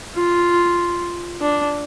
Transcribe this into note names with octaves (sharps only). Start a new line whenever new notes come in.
F4
D4